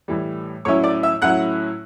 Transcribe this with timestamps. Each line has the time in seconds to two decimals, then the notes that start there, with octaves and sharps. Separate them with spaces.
0.08 A2 E3 G3
0.65 A2 F#3 C#4 E4 C#5 C#6
0.84 D5 D6
1.03 E5 E6
1.22 A2 F#3 C#4 E4 F#5 F#6